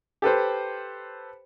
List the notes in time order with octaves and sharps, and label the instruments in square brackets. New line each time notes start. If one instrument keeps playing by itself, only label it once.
[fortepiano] G4 A4 B4 C5